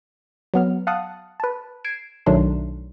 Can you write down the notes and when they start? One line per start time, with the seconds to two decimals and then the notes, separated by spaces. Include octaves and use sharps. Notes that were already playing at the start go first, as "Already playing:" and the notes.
0.54 F#3 B3 F6
0.87 F5 F#5 A5 D#6 F#6
1.40 B4 A5
1.84 G#6 C7 D7 E7
2.26 B1 D#3 F#3 A3 D4 C6